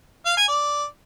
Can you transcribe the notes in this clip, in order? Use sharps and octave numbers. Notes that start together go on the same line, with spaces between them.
F5
G#5
D5